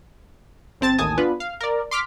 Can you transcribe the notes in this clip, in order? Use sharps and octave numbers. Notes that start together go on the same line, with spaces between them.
G1 C4 A5 A6
A1 D#2 A2 G#5 A5 D#6
B3 D4 F4 B4
F5
A#4 D5
C6 D6 F6 B6